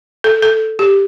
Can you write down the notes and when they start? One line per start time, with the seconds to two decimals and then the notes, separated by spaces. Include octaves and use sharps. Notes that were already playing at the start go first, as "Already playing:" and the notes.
0.24 A4
0.42 A4
0.79 G4